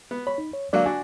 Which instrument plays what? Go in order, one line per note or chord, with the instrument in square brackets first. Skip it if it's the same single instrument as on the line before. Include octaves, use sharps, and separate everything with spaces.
[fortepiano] B3
[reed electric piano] C#5 [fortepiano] B5
[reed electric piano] D#4
C#5
[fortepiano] D3 F#3 A#3 [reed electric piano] D5 F5
[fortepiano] D4 F#4 [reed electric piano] G#5